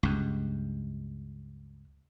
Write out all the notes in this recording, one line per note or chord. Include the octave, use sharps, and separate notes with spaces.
C#2 G2